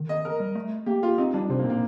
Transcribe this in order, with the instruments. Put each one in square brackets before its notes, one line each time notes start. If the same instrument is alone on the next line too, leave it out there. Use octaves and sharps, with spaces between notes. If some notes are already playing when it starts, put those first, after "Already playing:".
Already playing: [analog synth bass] D#3
[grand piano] D#5
A#4
[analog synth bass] G3
A3
[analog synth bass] A#3 [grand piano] G4
[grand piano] F4
[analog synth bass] C4 [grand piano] D#4
[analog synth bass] G3 [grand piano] D4
[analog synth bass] C3 [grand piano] C4
[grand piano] A#3
[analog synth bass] A#2
[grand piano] A#3